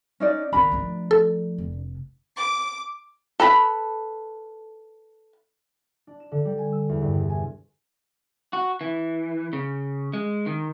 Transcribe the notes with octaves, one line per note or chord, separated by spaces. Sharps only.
C#4 D#4 D5
D#3 B3 D4 A#4 B5
F3 A3
A4
F1
D6
A4 B4 A#5 B5
D4
E7
D3
G3
G#5
E6
E2
G2
C3
G#5
F#4
E3
C#3
G#3
D#3